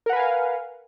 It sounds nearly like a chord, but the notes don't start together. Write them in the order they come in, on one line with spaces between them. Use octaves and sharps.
A#4 F#5 B4 G#5 F5